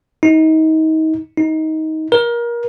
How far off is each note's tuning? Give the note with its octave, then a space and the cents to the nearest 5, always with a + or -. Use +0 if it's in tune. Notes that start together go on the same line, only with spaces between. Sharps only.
D#4 +30
D#4 +20
A#4 +25